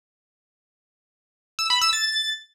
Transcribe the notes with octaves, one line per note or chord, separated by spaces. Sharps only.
E6
B5
E6
A6